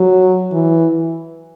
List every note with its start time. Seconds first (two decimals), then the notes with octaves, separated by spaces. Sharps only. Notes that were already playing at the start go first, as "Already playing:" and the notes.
Already playing: F#3
0.53 E3